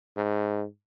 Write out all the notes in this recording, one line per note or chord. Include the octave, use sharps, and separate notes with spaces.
G#2